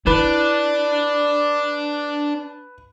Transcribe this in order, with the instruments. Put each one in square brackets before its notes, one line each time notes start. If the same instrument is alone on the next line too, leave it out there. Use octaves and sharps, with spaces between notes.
[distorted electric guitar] D4 [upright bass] E4 [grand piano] B4